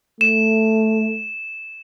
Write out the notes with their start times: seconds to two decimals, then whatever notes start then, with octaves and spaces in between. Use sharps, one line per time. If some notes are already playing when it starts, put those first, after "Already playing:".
0.21 A3 E7